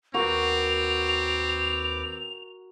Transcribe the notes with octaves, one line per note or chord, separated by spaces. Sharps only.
D#2 C4 F#4 A#4 B4 F#5 D6 F7